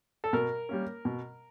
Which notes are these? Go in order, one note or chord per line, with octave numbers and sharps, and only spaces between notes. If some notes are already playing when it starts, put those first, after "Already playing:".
A4
B2 A#4
G3 A#3 C#4
B2